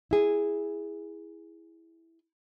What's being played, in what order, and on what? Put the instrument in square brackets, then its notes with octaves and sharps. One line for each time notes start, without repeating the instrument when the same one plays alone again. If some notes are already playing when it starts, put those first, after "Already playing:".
[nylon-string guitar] E4 G#4